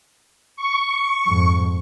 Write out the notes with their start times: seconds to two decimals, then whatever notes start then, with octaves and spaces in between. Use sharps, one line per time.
0.56 C#6
1.27 F2 G#2